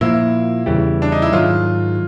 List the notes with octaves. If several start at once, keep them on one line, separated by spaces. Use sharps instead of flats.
A#2 F3 A#3 E4
E2 C#3 E3 G3
D4
D#4
E4
G#2 D#3 F#3 F4